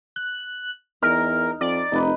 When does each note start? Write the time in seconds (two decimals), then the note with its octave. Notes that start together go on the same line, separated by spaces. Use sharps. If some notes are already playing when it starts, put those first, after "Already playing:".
0.16 F#6
1.03 E2 D#4 A#4 F6
1.61 F2 D5
1.92 F1 D#4 B4